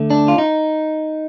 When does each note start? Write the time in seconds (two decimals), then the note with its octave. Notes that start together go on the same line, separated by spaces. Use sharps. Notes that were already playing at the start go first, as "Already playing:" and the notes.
Already playing: D2 D3 A3
0.10 D4
0.28 F4
0.38 D#4